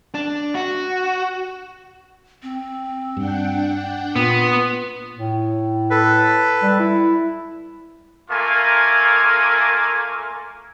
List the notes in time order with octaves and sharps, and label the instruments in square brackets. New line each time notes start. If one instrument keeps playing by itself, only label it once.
[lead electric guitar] D4
F#4
[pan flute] C4
[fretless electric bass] G2 [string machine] D4 F#5 G5
[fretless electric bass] A#2 [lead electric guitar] B3 [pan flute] F4
[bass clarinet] A2
[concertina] A4 B4
[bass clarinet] G3
E4
[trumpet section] A3 A#3 F4 G#5